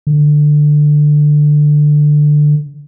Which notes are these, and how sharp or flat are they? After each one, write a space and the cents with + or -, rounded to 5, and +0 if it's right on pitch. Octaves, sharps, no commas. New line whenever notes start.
D3 +15